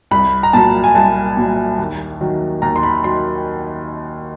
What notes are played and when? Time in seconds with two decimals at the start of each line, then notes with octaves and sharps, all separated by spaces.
0.11 C2 B5
0.43 A#5
0.53 A#2 F#3 A5
0.84 G#5
0.95 C2 A5
1.37 A#2 F#3
1.79 D#2
2.21 D#3 F#3
2.62 D#2 A#5
2.76 C6
2.83 B5
3.04 D#3 F#3 C6